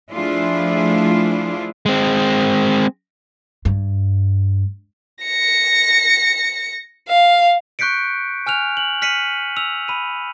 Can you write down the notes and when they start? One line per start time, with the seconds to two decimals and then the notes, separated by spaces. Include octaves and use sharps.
0.12 F3 A3 D4 E4 F4 G#4
1.86 G#3 C4
3.65 G2
5.24 A#6 C#7
7.08 F5
7.79 C#6 F#6 G6 B6 C#7 D7
8.46 G#5 F6 F#6 F7
8.77 F#7
9.02 F6 B6 C#7 D#7 F#7
9.57 E6 F7
9.88 B5 D#7